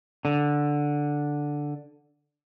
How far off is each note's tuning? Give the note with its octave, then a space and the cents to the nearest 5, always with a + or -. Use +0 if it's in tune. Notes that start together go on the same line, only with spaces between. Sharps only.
D3 +0